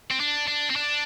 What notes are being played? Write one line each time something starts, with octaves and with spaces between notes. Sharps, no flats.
C4
D4
D4
C4
D4